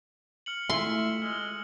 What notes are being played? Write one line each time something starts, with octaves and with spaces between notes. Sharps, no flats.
F6 C#7 F#7
A3 E4 F4 E5 C6
G#3 E6 F6 G7